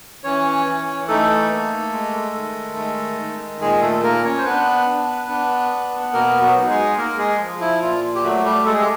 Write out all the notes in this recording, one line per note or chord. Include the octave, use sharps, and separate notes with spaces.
E3 C#4 C#5
E3
A3 D#4 A4
A#3
G#3
D#3
G#3
D#3
A#2 G#3 G#4
A3 A4
A#3 A#4
C#4 C#5
C5
B3 D4 B4
D4
D4
B3
B2 A#3 A#4
F#3 F#4
D#4
G#3 G#4
A#3 A#4
G#3 G#4
F3
E4
A#2 F4
G4
F#3 A3 F#4
G3 G4
G#3 A4
G#4
G4